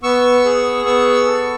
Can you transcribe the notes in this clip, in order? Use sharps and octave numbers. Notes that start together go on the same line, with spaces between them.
B3 C#6 E6
G#4
B3 C#6 E6
A4